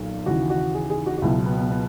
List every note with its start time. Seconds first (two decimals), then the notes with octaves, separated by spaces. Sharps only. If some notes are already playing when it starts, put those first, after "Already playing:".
Already playing: B1 A#2 F#3
0.26 D#2 C#3 E3 F#4
0.50 F#4
0.74 G#4
0.90 G#4
1.06 F#4
1.18 F#4
1.22 C#2 B2 F#3 E4
1.46 B3
1.58 B3
1.71 B3